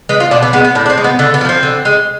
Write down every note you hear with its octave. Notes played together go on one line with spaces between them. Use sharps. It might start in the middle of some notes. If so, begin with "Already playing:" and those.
G#3 B4
F4
B2 D4
B3
G#3 B3
B3
A2 D4
D4
C4
G#3
B3
D3 A3
B3
F3 A3
C4
D3
G#3